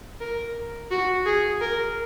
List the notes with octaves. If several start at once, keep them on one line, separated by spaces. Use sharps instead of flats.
A#4
F#4
G#4
A#4